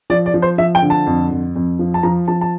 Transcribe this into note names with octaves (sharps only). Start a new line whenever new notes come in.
F3 D5
D5
F3
C5
F3 E5
G5
D3
A5
F2
F2
F2
F3
A5
F3 A#5
F3 A5
A5